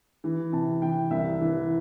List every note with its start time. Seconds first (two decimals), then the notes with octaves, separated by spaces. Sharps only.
0.24 E3
0.52 C3 A5
0.82 E3 G5
1.11 C2 E5
1.41 E3